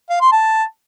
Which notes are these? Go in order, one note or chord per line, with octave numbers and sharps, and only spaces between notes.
F5
C6
A5